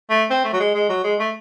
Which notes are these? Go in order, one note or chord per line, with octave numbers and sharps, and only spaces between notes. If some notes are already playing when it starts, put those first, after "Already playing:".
A3
C4
A3
F#3
G#3
G#3
F#3
G#3
A3